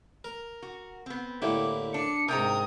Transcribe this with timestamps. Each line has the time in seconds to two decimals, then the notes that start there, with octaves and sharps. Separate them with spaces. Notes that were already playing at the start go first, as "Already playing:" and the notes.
0.24 A#4
0.62 F#4
1.06 B3 C4
1.42 A2 D3 A#3 E4 G4
1.94 D4 C#7
2.28 G#2 C3 A#4 G5 A#5 D#6